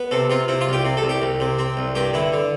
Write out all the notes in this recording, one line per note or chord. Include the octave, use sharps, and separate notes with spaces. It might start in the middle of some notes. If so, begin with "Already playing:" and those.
Already playing: B3
C3 A4
C3 F4
C3 E4
F4
C2
G4
C3
A4
C2
G4
C2
C3
C4
C2
G2 G4
D3 E4
D3